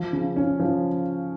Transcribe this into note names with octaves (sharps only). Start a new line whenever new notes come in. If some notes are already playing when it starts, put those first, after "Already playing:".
Already playing: F3
C#3
C#4
F3